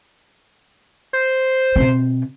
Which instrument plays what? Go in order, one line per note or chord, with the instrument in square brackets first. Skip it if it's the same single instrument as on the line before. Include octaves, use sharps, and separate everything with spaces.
[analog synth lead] C5
[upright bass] B2 C4